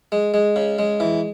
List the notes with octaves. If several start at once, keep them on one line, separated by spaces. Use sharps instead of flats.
G#3
G#3
C#3
G#3
E3